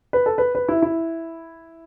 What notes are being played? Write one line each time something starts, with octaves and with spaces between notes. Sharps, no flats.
B4
A4
B4
B4
E4
E4